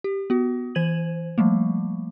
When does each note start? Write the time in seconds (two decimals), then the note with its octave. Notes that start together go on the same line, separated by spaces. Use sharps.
0.04 G4
0.30 B3 F#4
0.75 E3 C5 G#6 D#7 F#7
1.38 F3 G3 A3 A#3